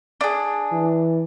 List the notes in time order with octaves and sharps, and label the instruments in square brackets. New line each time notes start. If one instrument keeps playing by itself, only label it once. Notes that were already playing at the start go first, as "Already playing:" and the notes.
[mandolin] D4 G#4
[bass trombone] E3